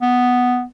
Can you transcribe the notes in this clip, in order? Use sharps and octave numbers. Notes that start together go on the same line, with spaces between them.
B3